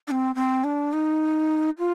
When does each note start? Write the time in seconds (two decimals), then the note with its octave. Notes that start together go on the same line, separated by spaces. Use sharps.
0.08 D4
0.11 C4
0.35 C4
0.64 D4
0.93 D#4
1.79 F4